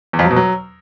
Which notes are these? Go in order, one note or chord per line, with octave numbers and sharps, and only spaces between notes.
E2
F2
F#3
B2
F#3